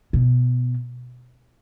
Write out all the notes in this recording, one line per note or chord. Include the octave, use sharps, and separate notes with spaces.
B2